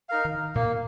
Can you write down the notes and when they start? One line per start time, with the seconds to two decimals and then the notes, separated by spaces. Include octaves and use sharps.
0.09 D#4 A#4 F5
0.25 D#3
0.55 A#2 A#3